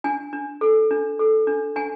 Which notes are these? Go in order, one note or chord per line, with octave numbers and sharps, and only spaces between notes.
D4 G#5
D4
A4
D4
A4
D4
D4 G#5